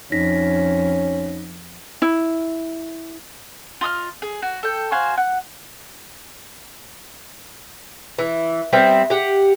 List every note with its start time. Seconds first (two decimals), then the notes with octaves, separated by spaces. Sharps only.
0.12 F2 C#4 D#4 A#6 B6
2.02 E4
3.81 F4 D#5 D#6 F6
4.22 G#4
4.42 F#4
4.63 A4 G5
4.92 F#4 C5 F5 G#5
5.18 F#5
8.18 E3
8.73 G3 B3 C4 E5
9.10 G4 F#5